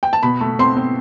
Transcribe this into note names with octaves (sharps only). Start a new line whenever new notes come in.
G5
A5
B2 B5
A3
C4 C6
C4